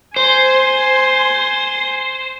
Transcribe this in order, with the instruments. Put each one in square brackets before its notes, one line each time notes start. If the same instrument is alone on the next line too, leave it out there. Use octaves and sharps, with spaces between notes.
[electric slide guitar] C5 [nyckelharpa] G#5 C6